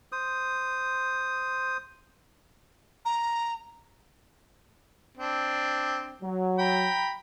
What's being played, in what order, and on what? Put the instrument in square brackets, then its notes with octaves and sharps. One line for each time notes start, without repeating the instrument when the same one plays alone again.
[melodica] C5 D#6
[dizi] A#5
[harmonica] C4 D4
[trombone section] F#3
[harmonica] G5 A#5 B5